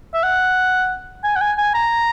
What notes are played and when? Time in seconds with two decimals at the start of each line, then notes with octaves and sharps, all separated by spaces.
0.14 E5
0.24 F#5
1.24 G#5
1.36 F#5
1.41 G#5
1.58 G#5
1.74 A#5